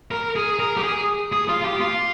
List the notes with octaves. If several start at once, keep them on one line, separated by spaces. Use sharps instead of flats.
A#4
G#4
A#4
G4
G#4
G#4
F4
G4
F4